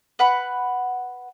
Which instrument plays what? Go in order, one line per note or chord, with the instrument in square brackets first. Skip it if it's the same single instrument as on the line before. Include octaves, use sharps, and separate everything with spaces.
[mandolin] B4 F#5 B5